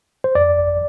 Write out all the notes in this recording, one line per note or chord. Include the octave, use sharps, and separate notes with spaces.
C5
F2 D5
G1